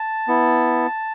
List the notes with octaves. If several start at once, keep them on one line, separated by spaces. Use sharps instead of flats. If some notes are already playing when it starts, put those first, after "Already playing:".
Already playing: A5
B3 E4